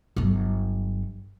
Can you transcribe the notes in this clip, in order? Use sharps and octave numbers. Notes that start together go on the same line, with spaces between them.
G1 F#3